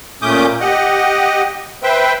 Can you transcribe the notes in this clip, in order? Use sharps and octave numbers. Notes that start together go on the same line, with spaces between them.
A#2 A3 C#4 D6 D#6 G6
G4 D#5 F#5
B4 C5 E5 G5